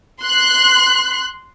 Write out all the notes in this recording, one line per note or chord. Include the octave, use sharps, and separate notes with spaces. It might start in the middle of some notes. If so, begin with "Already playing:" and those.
C6 F#6